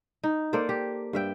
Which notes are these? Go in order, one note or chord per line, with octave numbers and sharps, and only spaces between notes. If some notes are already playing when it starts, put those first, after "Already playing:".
D#4
A#3 A4 C5 D5
G4
G2 E5 G5